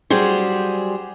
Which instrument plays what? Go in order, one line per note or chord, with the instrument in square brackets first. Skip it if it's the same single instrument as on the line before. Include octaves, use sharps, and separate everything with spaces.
[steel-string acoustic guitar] F#3 G3 G4 G#4 C5